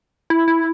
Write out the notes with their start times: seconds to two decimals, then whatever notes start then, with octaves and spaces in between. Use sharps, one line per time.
0.30 E4
0.48 E4